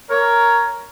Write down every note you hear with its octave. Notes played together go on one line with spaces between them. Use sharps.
A#4 C#5